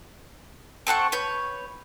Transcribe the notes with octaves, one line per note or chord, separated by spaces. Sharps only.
C4 A4 F#5 C#6
B4 C#5 G6